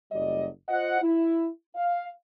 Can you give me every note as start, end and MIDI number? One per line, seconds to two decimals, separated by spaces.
0.12 0.48 30
0.12 0.48 54
0.12 0.48 55
0.12 0.48 74
0.12 0.48 75
0.69 1.00 65
0.69 1.00 72
0.69 1.00 75
0.69 1.00 78
1.02 1.48 64
1.76 2.09 77